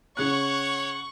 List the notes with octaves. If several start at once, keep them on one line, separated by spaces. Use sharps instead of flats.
C#3 C#5 F#5 C#6 F#6